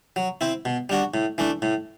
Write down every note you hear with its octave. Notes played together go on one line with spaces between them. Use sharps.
F#3
C4 E4
B2
G3 D4 F#4
A2
E3 A3 D4
A2